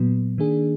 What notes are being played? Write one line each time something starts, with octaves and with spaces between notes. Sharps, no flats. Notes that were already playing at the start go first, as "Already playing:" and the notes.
Already playing: A#2 F#3 B3
D#3 A#3 D4 G#4